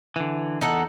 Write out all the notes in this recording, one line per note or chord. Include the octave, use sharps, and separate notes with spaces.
D3 E3
E2 D#4 A4 F#5